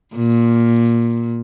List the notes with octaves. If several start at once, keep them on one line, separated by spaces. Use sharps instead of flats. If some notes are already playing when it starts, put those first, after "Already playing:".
A#2